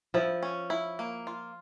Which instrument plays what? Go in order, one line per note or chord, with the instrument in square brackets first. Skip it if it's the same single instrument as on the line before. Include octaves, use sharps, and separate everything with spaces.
[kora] F3 [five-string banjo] E4
[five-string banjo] C#4
E4
A#3
F4